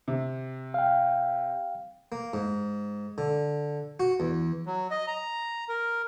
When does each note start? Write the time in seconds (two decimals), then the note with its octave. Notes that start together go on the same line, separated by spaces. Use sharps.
0.08 C3
0.74 F5 G5
2.12 A#3
2.34 G#2
3.18 D3
4.00 F#4
4.20 E2
4.66 F#3
4.91 D#5
5.07 A#5
5.69 A#4